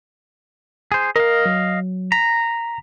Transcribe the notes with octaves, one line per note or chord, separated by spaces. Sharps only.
G#4 C5
A#4 D#5 F5
F#3
A#5 B6